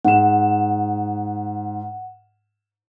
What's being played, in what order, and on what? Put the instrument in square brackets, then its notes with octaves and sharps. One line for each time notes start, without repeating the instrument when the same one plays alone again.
[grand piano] G#2 E7 [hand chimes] F#5